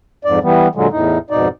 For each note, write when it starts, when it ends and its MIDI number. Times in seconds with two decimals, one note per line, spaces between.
0.25 0.39 41
0.25 0.39 44
0.25 0.39 74
0.43 0.68 52
0.43 0.68 55
0.43 0.68 59
0.75 0.88 46
0.75 0.88 50
0.75 0.88 54
0.75 0.88 56
0.91 1.18 40
0.91 1.18 45
0.91 1.18 63
1.30 1.48 41
1.30 1.48 44
1.30 1.48 47
1.30 1.48 63
1.30 1.48 74